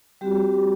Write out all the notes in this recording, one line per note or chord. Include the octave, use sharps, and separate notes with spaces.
G3 C4 F#4 G4